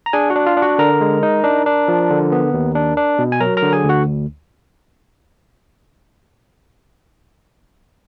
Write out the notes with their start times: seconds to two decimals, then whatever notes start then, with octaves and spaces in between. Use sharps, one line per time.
0.06 A#5
0.13 D4 G#4 G#5
0.30 F#4 F#5
0.36 D4
0.46 F4 F5
0.57 D4
0.62 F#4 F#5
0.79 D3 A#4 A#5
1.01 G#3
1.23 D#4
1.44 D4
1.66 D4
1.88 F3
2.10 D3
2.32 B3
2.54 D#2
2.75 D4
2.97 D4
3.19 B2
3.32 G#5
3.40 F#3 A#4 A#5
3.57 A#4 A#5
3.62 D3
3.73 G#4 G#5
3.84 D2
3.89 F#4 F#5